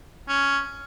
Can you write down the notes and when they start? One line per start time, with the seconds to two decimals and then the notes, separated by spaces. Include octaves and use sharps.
0.28 C#4